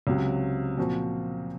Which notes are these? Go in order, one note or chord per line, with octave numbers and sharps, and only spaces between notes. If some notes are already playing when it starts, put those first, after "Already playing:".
C#2 C3 F#3
A#2 F3 C4 F#4